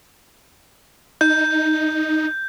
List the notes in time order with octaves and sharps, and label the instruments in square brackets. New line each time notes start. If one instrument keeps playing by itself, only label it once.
[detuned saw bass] D#4 [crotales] G6